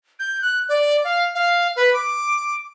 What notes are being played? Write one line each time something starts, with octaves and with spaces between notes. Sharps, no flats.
G6
F#6
D5
F5
F5
B4
D6